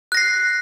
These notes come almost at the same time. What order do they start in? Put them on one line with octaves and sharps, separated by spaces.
F#6 A#6 C7